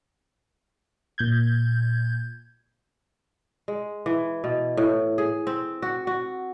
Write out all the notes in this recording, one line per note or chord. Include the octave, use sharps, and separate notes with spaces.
A#2 G6 G#6
G#3
E3
B2
A2
G#4
C4
F#4
F#4